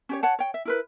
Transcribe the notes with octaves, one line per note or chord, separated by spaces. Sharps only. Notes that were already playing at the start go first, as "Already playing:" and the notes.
C#4 G4 C#5
C#5 F#5 A5
C#5 G5
E5
E4 A#4 B4